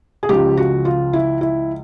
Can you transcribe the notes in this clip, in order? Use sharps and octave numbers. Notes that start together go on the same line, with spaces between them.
G#4
C#2 C#3 F3 G4
F#4
F4
E4
E4